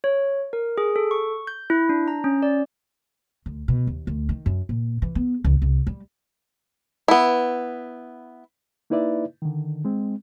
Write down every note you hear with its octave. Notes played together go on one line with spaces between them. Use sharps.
C#5
A#4
G#4
A4
C#6
G6
E4
D4
A#5
C#4
D5
D2
B2
D#2
D2
D#3
F#2
A#2
E3
B3
C#2
C2
G3
B3 E4
A#3 D#4 E4 B4 D5 E5
D3 D#3
G#3 C4